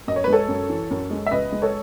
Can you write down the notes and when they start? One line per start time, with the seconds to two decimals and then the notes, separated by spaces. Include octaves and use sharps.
0.07 F#2 D#5
0.16 C#5
0.24 B4
0.28 G#3 A4 C#5
0.48 F#2
0.69 E3
0.91 F#2
1.11 G#3
1.27 E5
1.31 C#2 B4 D#5
1.52 G#3
1.62 A4 C#5